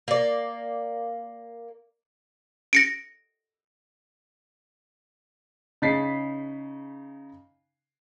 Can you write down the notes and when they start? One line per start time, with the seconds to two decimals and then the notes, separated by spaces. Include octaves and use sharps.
0.08 A#3 D5
2.73 A#6 C#7 D7
5.82 C#3 D#4 A6 B6 C7